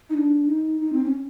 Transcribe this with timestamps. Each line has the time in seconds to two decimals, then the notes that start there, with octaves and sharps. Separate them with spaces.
0.10 D#4
0.14 D4
0.45 D#4
0.80 D#4
0.93 C4
1.04 C#4